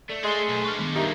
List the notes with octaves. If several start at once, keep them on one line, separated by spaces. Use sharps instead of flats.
A3 D5
G#3 G#4 C6
B1
D4 B4 C#6 F6
D#3 G#3 B3
G3 A#3 D#4 G4 E5